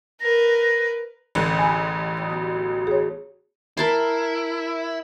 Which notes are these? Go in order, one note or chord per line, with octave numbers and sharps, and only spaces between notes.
A#4 B4 A#6
A1 D3 G#4 C5 D5
G#5 A#5 B5
F#3 G3 D#4
B2 D#4
G#4 C#5
E4 A#4 A5 C6